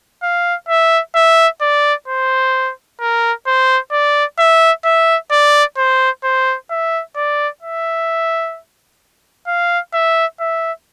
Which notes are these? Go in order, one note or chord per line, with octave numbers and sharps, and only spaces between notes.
F5
E5
E5
D5
C5
A#4
C5
D5
E5
E5
D5
C5
C5
E5
D5
E5
F5
E5
E5